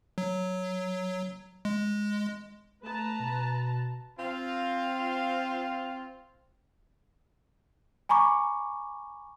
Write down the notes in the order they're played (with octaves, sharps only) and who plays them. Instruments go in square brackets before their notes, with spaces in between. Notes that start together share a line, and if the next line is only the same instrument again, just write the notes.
[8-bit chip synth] F#3
G#3
[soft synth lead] A3 [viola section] B4 A5 A#5
[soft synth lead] B2
[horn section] C4 F4
[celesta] G#5 A#5 B5 C#6 D6